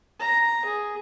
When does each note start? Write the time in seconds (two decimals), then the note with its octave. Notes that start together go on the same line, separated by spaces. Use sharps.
0.20 A#5
0.65 G#4